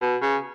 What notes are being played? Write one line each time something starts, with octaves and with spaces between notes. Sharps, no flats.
B2
C#3